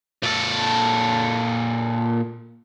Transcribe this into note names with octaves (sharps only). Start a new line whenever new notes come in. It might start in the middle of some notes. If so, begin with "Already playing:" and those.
A#2 A4